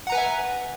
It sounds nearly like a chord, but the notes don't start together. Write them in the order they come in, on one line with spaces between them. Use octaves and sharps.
F#5 A#5 B4 G#5 E5